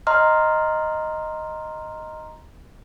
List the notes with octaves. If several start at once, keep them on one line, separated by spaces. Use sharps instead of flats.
D#5 A#5 C6 F6